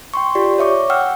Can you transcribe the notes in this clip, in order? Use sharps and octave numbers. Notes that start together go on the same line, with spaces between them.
G5 C6 C#6
F4 G4 D5
C#5 E5 C#6 D6
F#5 G5 E6 F6